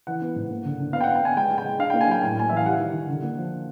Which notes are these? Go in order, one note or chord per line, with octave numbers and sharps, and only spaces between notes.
E3 F#5
B3
G#2
A#3
D3
D3
B3 F5
G5
B3 F#5
G5
B3 G#5
G#3 G5
G#3
G5
G#3
D4 F5
A#3 G5
G#5
F#3 G5
A2 G#5
A2 G#5
E3 E5
F5
G3 F#5
D#3
D#3
D3
A#3
F3